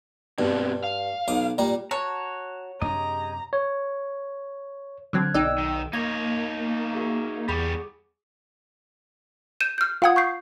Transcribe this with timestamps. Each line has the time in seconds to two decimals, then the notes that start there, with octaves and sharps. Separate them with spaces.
0.39 G2 B2 B3 C4
0.84 F5
1.28 B1 D6 D#6
1.58 A#2 G3 A#4
1.91 F#4 C#5 A5 A#5
2.82 F#2 C3 D4 G4 G#4 D#5 A#5
3.53 C#5
5.13 D3 F#3 C4 F6 F#6 G#6
5.34 B1 D#4 D5 G5 E6
5.58 D#3
5.93 A#3 D#4 C#5 G#6 A#6
6.93 F#4 G#4 E5
7.48 E2 G3 B3 G#4 B5 C#6 D6
9.61 G6 D#7 E7
9.78 F6 G6
10.02 F4 F5 F#5 D#6 G#6
10.16 C#6 G6 C7